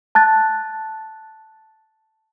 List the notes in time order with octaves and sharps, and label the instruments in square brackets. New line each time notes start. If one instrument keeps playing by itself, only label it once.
[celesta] A5 F#6 A6